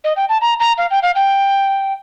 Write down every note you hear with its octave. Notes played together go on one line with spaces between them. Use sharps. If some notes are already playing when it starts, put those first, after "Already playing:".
D#5
G5
A5
A#5
A#5
F5
G5
F5
G5